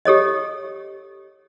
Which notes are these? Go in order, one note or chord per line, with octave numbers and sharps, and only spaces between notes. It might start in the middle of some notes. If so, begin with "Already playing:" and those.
G4 A4 C#5 D#5